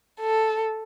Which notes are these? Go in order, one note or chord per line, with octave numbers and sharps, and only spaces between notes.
A4